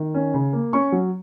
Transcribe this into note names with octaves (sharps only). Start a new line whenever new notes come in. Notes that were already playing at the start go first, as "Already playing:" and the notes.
Already playing: D#3
C#4
C#3
A#3
C#4 C#6
F#3